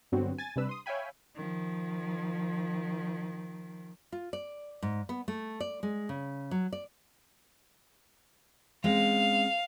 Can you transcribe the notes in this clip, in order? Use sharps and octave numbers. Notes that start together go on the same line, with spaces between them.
G2 D3 F#3 B3 C4 F#4
G#5 A6
C3 G3 D4 B4 E6
C6 D#6
C#5 E5 F5 G5 G#5 B5
D#3 F3
F4
D5
G#2
B3
A3
D5
G#3
C#3
F#3
D5
G#3 C4 C#4 F5